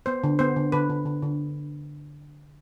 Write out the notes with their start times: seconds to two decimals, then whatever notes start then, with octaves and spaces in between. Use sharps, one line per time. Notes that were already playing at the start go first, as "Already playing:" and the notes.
0.06 B3 C5
0.24 D3
0.39 B3 C5
0.56 D3
0.72 D3 B4
0.90 D3
1.06 D3
1.22 D3